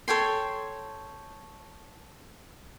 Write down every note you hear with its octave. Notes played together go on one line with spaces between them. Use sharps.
A4 C#5 G5 C6